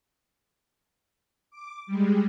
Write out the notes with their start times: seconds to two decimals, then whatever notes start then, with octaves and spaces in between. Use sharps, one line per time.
1.51 D6
1.87 G3 G#3